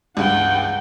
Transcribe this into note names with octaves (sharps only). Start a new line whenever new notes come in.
C#2 G2 F#5 G5